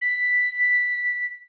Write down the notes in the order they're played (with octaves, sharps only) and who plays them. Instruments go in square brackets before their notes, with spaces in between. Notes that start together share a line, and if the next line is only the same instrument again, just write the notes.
[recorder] B6